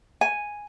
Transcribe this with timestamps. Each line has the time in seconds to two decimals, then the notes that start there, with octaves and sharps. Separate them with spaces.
0.21 G#5